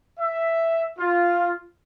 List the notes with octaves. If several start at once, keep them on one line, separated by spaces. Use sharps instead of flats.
E5
F4